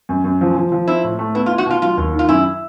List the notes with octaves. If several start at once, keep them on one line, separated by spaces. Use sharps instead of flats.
F#2
F#2
F3
F3
F3
C4 E4
A2
A3
B3 E4
F4
E4
F#4
B2 F4
F#3 F4
D#2
D#3
F4
F#2 E4